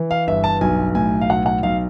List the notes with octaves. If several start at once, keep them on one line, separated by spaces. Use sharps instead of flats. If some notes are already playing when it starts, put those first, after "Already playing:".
Already playing: E3
F5
G1 E5
A5
B1 G#5
A2 G#5
F5
B1 F#5
F#5
B1 F5